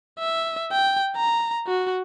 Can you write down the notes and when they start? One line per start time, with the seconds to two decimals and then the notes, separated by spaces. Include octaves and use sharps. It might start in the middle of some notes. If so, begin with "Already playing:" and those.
0.19 E5
0.72 G5
1.16 A#5
1.67 F#4